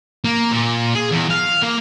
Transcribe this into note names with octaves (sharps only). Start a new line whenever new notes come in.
A#3
A#2
G#4
E2
F5
A#3